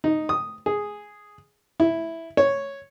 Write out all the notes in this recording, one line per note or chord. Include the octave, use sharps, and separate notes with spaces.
D#4
D#6
G#4
E4
C#5